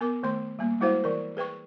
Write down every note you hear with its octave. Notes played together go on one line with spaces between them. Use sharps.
B3 A#4 D6
D#3 A3 C6
G3 A#3
G3 G#3 E4 F#4 C5 F5
E3 A#4
G#4 B4 G5 C#6